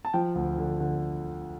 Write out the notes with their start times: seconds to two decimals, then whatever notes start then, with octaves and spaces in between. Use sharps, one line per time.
0.05 A5
0.14 F3 G5
0.35 D2
0.58 D3
0.80 D3